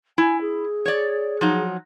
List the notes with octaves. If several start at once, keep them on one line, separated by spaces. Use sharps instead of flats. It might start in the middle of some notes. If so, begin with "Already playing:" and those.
E4 G#5
G#4
C#5 D5
F3 F#3 D#4